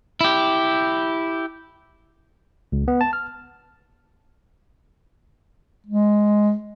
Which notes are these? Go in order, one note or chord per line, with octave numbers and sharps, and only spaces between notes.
E4 G4
C#2
B3
A5
F6
G#3